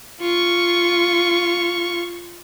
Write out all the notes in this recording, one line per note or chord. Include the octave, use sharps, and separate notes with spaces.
F4 C#6